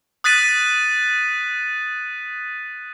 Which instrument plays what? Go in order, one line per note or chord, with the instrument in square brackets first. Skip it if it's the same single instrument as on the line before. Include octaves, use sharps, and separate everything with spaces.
[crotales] D#6 F#6 A6 B6 D#7